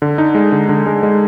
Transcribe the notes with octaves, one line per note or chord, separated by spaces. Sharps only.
D3
D#4
G#3
D3
D3
G#3
G#3